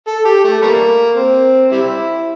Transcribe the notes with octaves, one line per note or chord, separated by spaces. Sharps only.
A4
G4
A3
G3 A#3
C4
G3 C4 E4